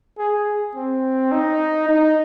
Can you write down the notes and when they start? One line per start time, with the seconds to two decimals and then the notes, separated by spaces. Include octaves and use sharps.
0.18 G#4
0.75 C4
1.32 D#4
1.89 D#4